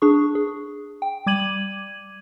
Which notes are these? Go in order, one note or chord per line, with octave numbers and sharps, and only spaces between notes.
D4 G#4 C#6
G#4
G5
G3 D6 G#6 D#7 F#7